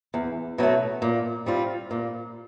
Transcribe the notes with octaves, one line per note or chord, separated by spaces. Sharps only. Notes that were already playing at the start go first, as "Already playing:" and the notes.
E2
B2 F#3 A3
A#2
G3 C4 F4
A#2